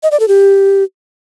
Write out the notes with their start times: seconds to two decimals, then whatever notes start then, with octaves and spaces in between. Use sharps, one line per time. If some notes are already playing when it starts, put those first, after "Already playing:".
0.03 D#5
0.11 D5
0.20 A4
0.28 G4